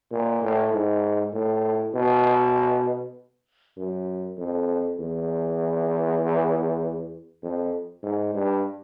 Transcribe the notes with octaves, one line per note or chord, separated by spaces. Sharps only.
A#2
A2
G#2
A2
B2
F#2
F2
E2
F2
G#2
G2